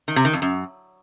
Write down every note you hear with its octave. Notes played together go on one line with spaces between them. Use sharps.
D#3
C3
D#3
F2
F#2